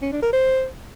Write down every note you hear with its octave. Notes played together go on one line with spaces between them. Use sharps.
C#4
D4
A#4
C5